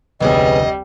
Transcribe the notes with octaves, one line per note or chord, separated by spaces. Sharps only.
F1 D2 G3 B3 C#4 G#4 D#5